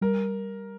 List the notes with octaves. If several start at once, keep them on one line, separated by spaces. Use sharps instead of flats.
G3 A#4